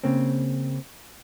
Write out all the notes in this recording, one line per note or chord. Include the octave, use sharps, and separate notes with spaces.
C#3 A#3 C4